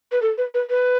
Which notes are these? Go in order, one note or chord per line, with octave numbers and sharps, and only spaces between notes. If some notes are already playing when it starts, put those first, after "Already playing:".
B4
A4
B4
B4
B4